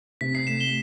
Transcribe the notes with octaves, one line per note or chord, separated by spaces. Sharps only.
C3 B6
C7
A3 C7 E7
E7 G7